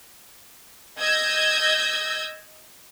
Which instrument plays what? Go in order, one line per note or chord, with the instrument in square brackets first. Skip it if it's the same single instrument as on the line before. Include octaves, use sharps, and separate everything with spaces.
[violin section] D#5 E6 G6 G#6 A#6